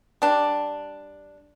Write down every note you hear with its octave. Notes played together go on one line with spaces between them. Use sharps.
G3 D4